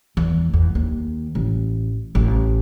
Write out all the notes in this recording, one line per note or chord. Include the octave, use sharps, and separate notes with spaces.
E2
E2
D#2
A1
A1